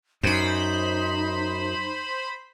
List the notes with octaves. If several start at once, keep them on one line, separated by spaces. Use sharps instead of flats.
F#2 D#4 C5 B5